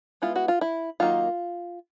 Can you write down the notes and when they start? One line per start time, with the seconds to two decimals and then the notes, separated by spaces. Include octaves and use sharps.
0.22 G#3 B3 E4 F4
0.36 F#4
0.48 F4
0.61 E4
1.00 D#3 F#3 A#3 D#4 F4